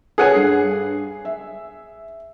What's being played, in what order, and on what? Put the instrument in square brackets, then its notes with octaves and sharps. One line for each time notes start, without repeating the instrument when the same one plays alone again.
[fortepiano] G#4 F#5 G#5 [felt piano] A4 B4 C#5
[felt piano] G2 C7
E5